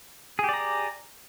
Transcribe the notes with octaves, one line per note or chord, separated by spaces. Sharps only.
G4 G#4 D5 A#5